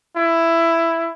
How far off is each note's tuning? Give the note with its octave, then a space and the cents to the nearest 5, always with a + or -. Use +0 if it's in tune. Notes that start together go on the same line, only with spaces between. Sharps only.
E4 +10